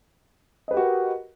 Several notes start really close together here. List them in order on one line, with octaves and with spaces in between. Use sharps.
D#5 B4 G4 F#4 A#4